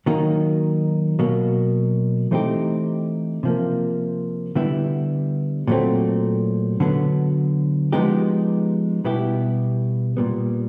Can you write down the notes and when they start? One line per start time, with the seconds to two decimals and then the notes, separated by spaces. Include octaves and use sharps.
0.06 D#3 F#3 A#3 D#4
1.19 B2 F#3 A#3
2.31 E3 A3 C4 D#4 G4
3.43 C3 F3 A#3
4.56 D3 G3 B3 E4
5.67 A#2 F#3 A3 C4
6.80 D3 F#3 B3
7.92 F3 G#3 B3 D#4 G4
9.05 B2 G3 B3 E4 G4
10.17 A#2 G3 B3